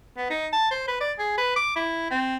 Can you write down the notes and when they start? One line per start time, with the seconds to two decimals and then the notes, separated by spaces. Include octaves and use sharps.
0.17 B3
0.30 D#4
0.53 A5
0.71 C5
0.88 B4
1.00 D5
1.19 G#4
1.38 B4
1.56 D6
1.76 E4
2.10 C4